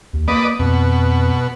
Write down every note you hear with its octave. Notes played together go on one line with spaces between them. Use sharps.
D#2
A#3 B4 D5 D#5
F2 B2